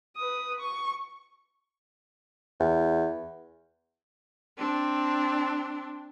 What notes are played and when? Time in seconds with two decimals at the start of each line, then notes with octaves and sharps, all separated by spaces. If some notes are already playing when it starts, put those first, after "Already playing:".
0.17 B4 D#6
0.60 C#6
2.60 E2
4.58 C4 D4